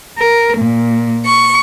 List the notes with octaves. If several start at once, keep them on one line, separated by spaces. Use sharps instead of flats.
A#4
A#2
C#6